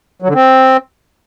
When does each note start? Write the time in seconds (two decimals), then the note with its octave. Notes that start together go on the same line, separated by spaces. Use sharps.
0.22 F#3
0.28 D3
0.35 C4